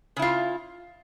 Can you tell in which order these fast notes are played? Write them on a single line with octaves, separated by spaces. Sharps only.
C#3 E4 F4